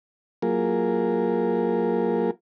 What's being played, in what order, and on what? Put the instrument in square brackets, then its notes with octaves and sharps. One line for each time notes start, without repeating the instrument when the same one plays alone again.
[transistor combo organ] F#3 A#3 F4 G#4 A#4